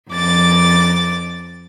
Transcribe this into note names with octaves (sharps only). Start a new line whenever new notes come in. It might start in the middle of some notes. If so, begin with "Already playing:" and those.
F2 D6 A6